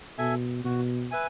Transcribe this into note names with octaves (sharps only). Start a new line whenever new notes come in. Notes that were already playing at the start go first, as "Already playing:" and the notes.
B2 A4 E5 G#5
B2 F#4
B4 E5 G#5